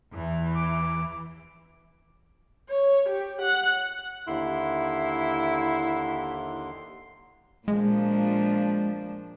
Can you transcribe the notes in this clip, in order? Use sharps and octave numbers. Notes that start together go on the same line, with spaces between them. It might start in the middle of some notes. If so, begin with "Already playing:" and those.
E2 E3
D6
C#5
G4
F#5
D#2 D3 E4 C6
A#2 F3 G#3 D4